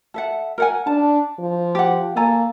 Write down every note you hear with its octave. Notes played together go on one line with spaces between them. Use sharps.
A4 E5 F#5
A#4 F#5 G#5
D4 A5
F3
G4 F#5
A#3 A4 G#5 A#5